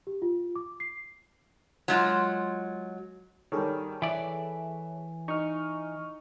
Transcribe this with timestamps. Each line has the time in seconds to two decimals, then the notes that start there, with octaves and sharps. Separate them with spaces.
0.07 G4
0.22 F4
0.56 D6
0.80 C7
1.88 F#3 G#3 F4
3.52 D#3 G3 G#4 A4 C#5
4.02 E3 D5 E5
5.28 D#4 C#6 F6